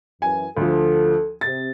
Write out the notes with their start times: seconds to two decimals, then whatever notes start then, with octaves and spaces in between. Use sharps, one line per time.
0.22 F#2 E3 G#5
0.57 D2 F3 A4
1.41 C3 A6